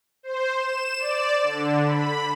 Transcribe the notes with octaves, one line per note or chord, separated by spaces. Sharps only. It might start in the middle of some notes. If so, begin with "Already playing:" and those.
C5
E7
D5
D3
B5